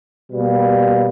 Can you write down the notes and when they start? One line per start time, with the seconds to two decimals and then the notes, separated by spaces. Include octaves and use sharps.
0.31 B2 G3 A#3